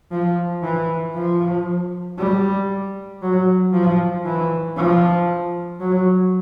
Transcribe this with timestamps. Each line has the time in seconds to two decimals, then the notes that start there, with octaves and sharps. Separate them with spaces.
0.11 F3
0.63 E3
1.15 F3
2.18 G3
3.22 F#3
3.73 F3
4.25 E3
4.77 F3
5.80 F#3